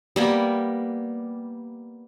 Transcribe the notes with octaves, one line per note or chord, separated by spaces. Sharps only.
G3 A#3 B3